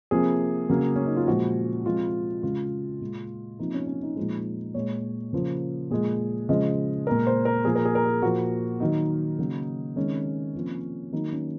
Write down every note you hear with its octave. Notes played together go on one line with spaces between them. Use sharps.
C3 F3 A#3 G#4
C#3 F#3 A#3
C#4
D#4
F4
A#2 F3 G#3 F#4
C3 F3 G#3 F4
C#3 G#3 F4
A#2 G#3
C3 F3 A#3 D#4
C#4
C#4
D#4
A#2 F3 G#3 D#4
A#2 G#3 C#5
C#3 F3 A#3
A#2 F3 G#3 G#4
C#3 F3 G#3 D#5
A#2 G#3 A#4
C5
A#4
A#2 F3 A#3 G#4
A#4
G#4
A#4
G#4
A#2 F3 A#3 F#4
D#3 F#3 A#3 D#4
C#3 F#3 A#3
C3 D#3 G#3 C#4
C3 F3 A#3
D#3 F#3 A#3 D#4
C#4